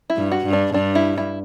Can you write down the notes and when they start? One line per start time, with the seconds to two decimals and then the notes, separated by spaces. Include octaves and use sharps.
0.10 E4
0.16 G2
0.32 F#4
0.46 G2
0.53 D4
0.74 G2 D4
0.95 E4
1.18 E4